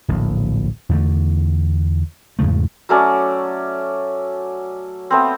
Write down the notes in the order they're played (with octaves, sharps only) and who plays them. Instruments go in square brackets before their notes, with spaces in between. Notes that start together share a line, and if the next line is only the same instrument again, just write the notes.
[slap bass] D1 A#1
E2 D3 A3
E2 G#2 C#3 A3
[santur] F#3 A3 C#4 D5
A3 B3 C4